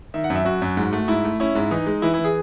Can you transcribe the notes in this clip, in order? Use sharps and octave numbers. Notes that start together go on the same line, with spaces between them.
D#3 E5
F#5
F#2
E5
F#2 F#4
F#2
G#2
A3
G#2 E4
A3
C#4 E4
G#2
E3 D#4
G#3
E3 E4
E4
E3
G#4